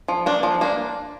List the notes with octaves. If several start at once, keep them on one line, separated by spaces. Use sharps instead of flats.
F3
A#3 D4
F3
A#3 D4